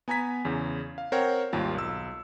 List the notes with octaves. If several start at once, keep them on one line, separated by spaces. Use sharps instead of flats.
B3 G#5 A#5 G#6 B6
E2 C#3
F5
C4 A#4 C5 C#5 F#5 G5
G#1 D#2 G3 F4
B1 E6